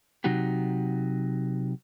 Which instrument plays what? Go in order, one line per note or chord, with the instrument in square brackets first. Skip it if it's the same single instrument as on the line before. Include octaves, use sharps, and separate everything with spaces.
[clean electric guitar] C3 F#3 D#4 F#4 G4